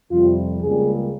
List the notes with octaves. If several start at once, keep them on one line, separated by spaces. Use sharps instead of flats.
F2 C3 G3 F4
C#2 C#3 G3 A#3 G#4